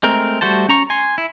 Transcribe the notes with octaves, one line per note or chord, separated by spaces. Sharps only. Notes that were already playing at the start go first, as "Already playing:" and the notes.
G#3 A3 C4 A#4
G3 A3 F#4 C5 A5
C#4 A#5 C#6
G#5 C6
E4